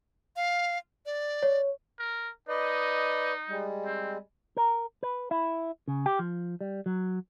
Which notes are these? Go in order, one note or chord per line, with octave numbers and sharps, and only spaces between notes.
F5
D5
C#5
A#4
D#4 B4 D5 D#5
G3 G#3
C4
A#4
B4
E4
C#3
G4
F3
G3
F#3